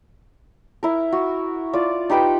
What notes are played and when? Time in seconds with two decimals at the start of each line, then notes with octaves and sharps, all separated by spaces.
0.83 E4 A#4
1.12 F#4
1.73 F4 D5
2.10 D#4 G4 B4 G5